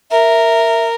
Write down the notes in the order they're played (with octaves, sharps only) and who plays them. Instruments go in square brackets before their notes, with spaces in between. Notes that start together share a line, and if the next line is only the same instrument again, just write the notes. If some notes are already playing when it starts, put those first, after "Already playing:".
[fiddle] A#4 [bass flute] E5